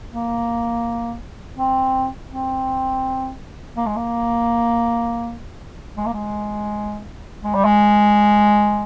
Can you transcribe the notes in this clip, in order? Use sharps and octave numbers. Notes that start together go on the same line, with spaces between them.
A#3
C4
C4
A#3
G#3
A#3
G#3
A#3
G#3
G#3
G3
G#3